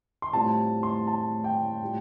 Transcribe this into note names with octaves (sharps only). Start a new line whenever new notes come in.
C6
A2 G3 C4 F4 A5
C6
A5
G5
A2 G3 F4